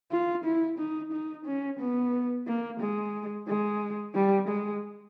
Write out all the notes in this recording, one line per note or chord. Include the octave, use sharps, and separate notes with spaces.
F4
E4
D#4
D#4
C#4
B3
A#3
G#3
G#3
G3
G#3